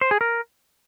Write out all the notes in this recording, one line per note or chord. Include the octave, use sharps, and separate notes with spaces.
C5
G#4
A#4